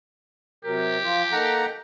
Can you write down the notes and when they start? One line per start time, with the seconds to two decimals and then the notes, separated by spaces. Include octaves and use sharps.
0.65 C3 F#3 G4 A#4
1.03 F3 F4
1.32 A#3 D#4 A4 F#5 A#5